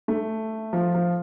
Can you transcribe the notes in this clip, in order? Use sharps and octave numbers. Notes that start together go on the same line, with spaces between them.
A3
F3
F3